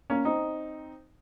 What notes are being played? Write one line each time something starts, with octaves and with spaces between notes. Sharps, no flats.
A#3 C#4
C4 D#4